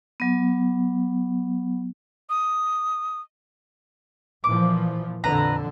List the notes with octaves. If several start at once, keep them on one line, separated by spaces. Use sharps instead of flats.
F#3 B3
D#6
A#2 E3 F3 D6
F2 A#2 D3 B4 A#5